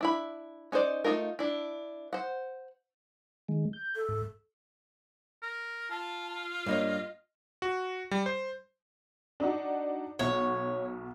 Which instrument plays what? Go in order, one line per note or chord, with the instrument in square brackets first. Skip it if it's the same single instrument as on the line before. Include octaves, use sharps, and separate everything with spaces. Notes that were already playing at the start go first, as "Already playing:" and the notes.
[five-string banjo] D4 E4 B5
C#4 D#4 A#4 C5 D5
A3 C4 D#4 F4 A#4
D4 E4
C5 F#5
[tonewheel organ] D#3 G#3
G6
[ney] A4
[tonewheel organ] G#2
[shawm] A#4
[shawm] F4 [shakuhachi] A5
[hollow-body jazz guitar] G2 A#3 C#5 [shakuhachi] D#5
[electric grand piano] F#4
G3
C5
[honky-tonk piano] D4 D#4 F#4
[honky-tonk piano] B1 B2 F#5 [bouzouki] C#5